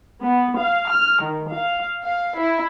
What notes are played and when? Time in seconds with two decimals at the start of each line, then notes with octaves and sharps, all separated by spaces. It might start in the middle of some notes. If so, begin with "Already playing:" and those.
0.22 B3
0.57 F5
0.90 F6
1.22 D#3
1.52 F5
2.03 F5
2.37 E4